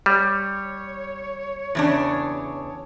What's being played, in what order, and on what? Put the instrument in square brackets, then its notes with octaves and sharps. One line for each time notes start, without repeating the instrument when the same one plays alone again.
[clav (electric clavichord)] G3 [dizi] C#5
[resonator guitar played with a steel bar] E2 C#3 D4